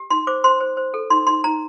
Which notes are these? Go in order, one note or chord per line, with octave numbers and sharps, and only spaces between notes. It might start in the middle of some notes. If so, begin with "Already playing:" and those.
Already playing: G4
D#4 C6
C5 D6
C5 C6
C5
C5
A4
D#4 C6
D#4 C6
D#4 A#5